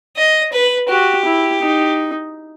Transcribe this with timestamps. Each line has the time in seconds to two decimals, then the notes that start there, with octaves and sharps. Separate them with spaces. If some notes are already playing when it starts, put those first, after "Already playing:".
0.17 D#5
0.52 B4
0.89 F#4 G4
1.25 E4
1.62 D#4